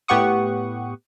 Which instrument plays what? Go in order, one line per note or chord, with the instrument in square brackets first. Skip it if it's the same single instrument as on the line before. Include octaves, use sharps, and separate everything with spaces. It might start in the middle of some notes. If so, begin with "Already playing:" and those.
[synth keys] A2 B3 G4 F#5 C#6 D#6